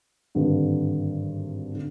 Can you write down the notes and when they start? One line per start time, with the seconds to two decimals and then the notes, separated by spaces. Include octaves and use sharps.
0.35 G#1 G2 D3 G3
1.75 D3